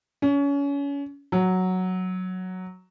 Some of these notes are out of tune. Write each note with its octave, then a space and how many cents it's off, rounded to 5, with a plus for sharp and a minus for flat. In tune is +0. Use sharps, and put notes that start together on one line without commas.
C#4 +30
F#3 +0